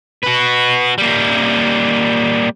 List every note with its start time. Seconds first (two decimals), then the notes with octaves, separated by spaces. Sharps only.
0.24 F#4 B4
0.98 G3 A#3